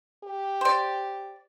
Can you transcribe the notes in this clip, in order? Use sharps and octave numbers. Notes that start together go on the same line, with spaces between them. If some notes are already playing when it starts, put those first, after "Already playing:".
G4
C5 D5